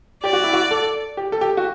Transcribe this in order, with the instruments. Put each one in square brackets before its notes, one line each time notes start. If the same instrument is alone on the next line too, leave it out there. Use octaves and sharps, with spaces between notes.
[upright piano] G4 [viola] D5
[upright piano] F#4
E4
F#4
A4
G4
A4
G4
F#4